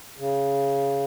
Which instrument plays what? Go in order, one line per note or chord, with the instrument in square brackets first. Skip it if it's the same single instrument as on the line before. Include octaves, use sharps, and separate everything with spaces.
[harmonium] C#3